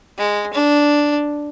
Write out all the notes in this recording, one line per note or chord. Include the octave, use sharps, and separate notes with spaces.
G#3
D4